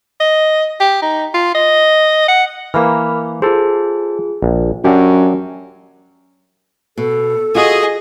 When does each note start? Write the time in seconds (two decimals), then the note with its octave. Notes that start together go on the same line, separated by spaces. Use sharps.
0.21 D#5
0.81 G4
1.02 D#4
1.35 F4
1.55 D#5
2.29 F#5
2.74 E3 A#3 A#4 B5 F6
3.42 F4 G#4 A4 C5
4.42 A#1
4.84 F#2 F#3 D4 G4 G#5
6.98 B2 A4
7.55 F4 F#4 G#4 D#5